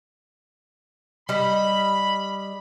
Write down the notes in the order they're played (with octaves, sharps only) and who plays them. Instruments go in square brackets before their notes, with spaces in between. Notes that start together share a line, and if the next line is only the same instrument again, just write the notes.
[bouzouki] G3 D#5 [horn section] B5